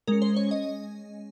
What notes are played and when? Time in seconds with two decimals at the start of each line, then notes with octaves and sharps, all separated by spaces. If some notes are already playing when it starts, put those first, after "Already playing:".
0.07 G#3 C#4 A#4
0.22 C5
0.36 C#5
0.51 D#5